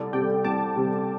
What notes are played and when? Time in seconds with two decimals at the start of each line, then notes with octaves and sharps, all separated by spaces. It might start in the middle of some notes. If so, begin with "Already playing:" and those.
Already playing: C2 A4 D5
0.13 C3 G3 D5 G5
0.44 C2 A5 D6
0.76 C3 G3